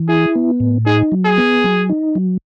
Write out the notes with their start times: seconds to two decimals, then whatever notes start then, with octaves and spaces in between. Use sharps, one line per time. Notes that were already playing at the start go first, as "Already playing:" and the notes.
Already playing: E3
0.09 E4 G#4
0.35 B3
0.60 A2
0.86 D#4 G#4
1.12 F#3
1.25 G#4
1.38 B3
1.64 F#3
1.90 D#4
2.15 F#3